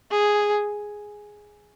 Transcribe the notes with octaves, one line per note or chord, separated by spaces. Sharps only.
G#4